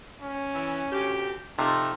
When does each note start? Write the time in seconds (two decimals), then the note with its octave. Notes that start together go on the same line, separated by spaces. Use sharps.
0.22 C#4
0.55 E3
0.92 D2 G4
1.59 C3 F3 A3 D#4